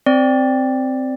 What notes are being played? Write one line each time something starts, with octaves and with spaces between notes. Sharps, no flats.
C4 D5